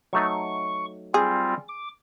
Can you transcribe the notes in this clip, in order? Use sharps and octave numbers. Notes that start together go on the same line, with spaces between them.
F#3 A3 D#4 C#6
G3 C4 F4 G#4
D6